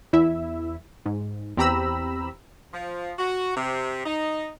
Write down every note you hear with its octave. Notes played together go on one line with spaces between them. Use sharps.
E2 E4 E5
G#2
E2 C4 G4 A#5 B5 E6
F3
F#4
C3
D#4